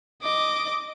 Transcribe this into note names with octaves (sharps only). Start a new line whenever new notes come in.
D#5 D6